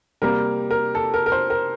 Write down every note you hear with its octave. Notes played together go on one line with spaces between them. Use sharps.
C3 G3 A#3 A#4
A#4
A4
A#4
A#4
C5
A#4